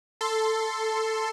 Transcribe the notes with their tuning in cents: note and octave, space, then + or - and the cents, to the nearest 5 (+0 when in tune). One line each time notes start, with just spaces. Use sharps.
A4 +5 C6 +0